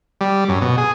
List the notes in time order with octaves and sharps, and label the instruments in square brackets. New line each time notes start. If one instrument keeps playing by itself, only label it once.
[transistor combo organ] G3
F#2
B2
G#4